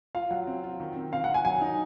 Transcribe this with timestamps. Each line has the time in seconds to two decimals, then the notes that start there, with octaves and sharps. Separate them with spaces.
0.15 F4 F5
0.31 F#3 F#5
0.47 C4
0.64 F4
0.80 D#3
0.96 C4
1.12 C4 F5
1.24 F#5
1.29 D#3
1.34 G#5
1.45 F#3 G#5
1.61 D#4